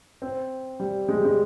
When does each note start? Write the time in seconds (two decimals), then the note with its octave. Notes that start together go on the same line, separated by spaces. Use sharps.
0.22 C4
0.80 G3
1.09 G#3
1.17 G3
1.25 G#3